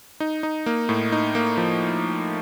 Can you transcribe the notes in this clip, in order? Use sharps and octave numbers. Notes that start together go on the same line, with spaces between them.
D#4
D#4
A#3
A2
D#4
A#3
F3